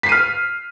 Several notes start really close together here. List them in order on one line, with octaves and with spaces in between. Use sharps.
B6 C7 D#7 F6